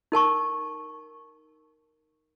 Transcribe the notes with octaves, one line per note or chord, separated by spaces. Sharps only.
D#4 A#4 A5 C#6